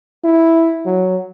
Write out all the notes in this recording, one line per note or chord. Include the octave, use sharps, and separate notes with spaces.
E4
F#3